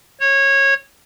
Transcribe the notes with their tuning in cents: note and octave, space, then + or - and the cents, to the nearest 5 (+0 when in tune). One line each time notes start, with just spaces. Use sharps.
C#5 -20